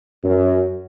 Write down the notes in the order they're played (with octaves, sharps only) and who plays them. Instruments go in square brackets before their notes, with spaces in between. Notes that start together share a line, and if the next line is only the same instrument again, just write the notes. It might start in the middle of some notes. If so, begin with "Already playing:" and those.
[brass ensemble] F#2